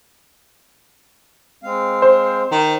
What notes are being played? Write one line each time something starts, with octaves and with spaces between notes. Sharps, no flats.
G#3 C4 F5
C5
D#3